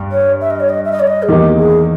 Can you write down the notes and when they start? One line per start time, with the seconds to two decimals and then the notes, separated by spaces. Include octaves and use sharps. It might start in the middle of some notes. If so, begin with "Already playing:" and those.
Already playing: G2 G3
0.12 C#5
0.41 E5
0.50 D#5
0.60 C#5
0.69 D#5
0.85 E5
0.92 D#5
1.00 C#5
1.07 D#5
1.23 G#4
1.29 E2 D#3 A#3 D#4 G4
1.58 G#4